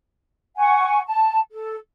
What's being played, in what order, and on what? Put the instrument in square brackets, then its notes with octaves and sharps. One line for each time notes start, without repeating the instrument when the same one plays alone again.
[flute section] F#5 G#5 C#6
A5
A4